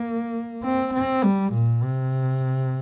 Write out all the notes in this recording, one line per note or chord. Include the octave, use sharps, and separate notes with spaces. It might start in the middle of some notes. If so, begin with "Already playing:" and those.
Already playing: A#3
C4
C4
G3
A#2
C3